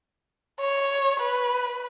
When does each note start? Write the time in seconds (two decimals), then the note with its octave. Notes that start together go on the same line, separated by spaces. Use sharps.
0.61 C#5
1.20 B4